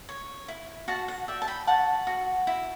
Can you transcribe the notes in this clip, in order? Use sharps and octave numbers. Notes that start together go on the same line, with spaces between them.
C#5
E4
F#4 F#5 A5
F#5
D5 E5 G5
A5
G5 B5
F#4 F#5 A5
F#4
E4